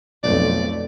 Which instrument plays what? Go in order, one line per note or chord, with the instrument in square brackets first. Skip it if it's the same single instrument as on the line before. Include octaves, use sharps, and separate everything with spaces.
[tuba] B1 [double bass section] F2 A3 [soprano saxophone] D5